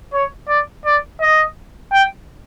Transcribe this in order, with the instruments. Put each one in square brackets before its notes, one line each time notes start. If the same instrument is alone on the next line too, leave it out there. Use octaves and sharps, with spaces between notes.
[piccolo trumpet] C#5
D5
D5
D#5
G5